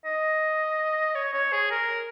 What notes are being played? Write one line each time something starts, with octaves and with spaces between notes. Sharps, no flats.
D#5
C#5
C#5
G#4
A#4